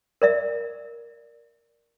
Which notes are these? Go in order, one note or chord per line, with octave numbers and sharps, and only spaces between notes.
A#4 D5 E5